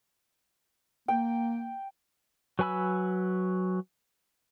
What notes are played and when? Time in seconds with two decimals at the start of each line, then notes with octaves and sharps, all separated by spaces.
1.08 A#3 G5
2.59 F#3 B4 G#5 B5 E6